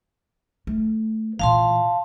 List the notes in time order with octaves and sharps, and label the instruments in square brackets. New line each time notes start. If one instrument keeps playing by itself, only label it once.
[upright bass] A3
[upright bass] A#2 E3 [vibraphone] F5 A5 C6